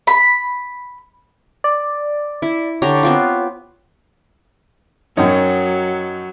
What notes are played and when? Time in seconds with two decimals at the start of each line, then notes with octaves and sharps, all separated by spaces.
0.07 B5
1.64 D5
2.42 E4
2.82 D3 G4 C#5 A#5
3.03 B3 C4 F4
5.17 F#2 F#3 D#4 C#5 G5